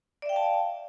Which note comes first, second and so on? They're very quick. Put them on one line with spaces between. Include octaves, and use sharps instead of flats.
D5 E5 G5 F5 A5